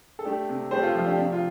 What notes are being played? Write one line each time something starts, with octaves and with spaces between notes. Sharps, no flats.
A4
A3 D4 G4
C3
A3 G4 C5
F4 A4
F3 F4
D4 G4
C3 D4 G4
F4